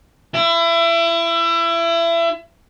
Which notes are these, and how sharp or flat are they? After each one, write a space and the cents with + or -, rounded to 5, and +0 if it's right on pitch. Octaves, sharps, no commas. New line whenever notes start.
E4 +30